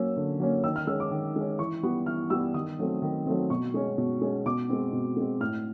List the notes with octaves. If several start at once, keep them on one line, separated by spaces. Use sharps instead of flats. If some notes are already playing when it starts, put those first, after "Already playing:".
Already playing: F#3 A#3 C#4 E6
D3
F#3 A#3 C#4
D#3 E6
F6
G#3 C#4 E6
D6
D#3
G#3 C#4
E3 C#6
G3 B3
E3 F6
G3 B3 E6
D#3 D#6
F#3 A3 C4
D#3
F#3 A3 C4
B2 C#6
G#3 C#4
B2
G#3 C#4
B2 D6
G#3 C4
B2
G#3 C4
A2 F6